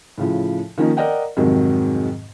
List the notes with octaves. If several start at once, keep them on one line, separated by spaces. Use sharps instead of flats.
A2 C#3 F3
D#3 F3 A#3 C#4 D#4
A#4 D5 D#5 F#5 G5
F2 G#2 C3 D#3 F#3